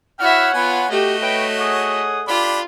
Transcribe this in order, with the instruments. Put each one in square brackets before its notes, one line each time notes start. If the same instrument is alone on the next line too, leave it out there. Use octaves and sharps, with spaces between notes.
[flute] E4 [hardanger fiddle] F#4 E5 [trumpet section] C#5 F#5 [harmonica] F6
[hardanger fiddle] B3 F4 [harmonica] G#5 [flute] B5
[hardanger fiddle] A3 D#5 [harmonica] F#4 [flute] G4
[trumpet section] B4 E5 G5 [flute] C#5
[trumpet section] G#4 F#5 D#6
[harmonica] D4 G4 B5 [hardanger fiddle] F4